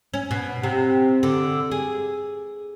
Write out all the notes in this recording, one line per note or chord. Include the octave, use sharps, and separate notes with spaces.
C#4
B2
C3
D3
G#4